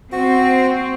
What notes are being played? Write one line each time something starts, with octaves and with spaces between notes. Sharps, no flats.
C4 F#4